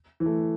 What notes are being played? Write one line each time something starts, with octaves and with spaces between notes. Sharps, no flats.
E3
A3